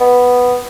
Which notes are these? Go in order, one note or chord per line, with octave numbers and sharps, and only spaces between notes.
B3